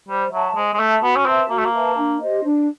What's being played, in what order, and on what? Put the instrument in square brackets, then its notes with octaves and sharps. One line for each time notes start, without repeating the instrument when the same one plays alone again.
[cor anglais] G3 [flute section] C5
[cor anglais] F#3 [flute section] E5 A5
[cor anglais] G#3 [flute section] C5
[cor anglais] G#3
[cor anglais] A3 [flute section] E5 A5
[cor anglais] B3 [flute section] F#4
[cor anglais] C#4
[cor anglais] C4 [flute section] B4 E5 A5
[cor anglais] A#3 [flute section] F#4
[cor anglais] A3
A#3
[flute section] B4 E5 A5
D4
G4 C5 D#5
D4